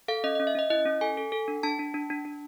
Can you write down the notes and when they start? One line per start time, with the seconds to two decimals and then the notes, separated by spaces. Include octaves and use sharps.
0.08 A4 F5
0.24 C#4 D#5
0.35 C#4 D#5
0.47 E5
0.55 C#4 D#5
0.70 E4 D#5
0.86 C#4
1.01 A4 G#5
1.17 A4
1.32 A4
1.48 D4
1.63 D4 A5
1.79 D4
1.94 D4
2.10 D4
2.25 D4